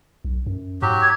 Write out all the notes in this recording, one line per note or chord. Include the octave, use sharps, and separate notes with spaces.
B1
F#2
G#2 F#3 G4
D6 G#6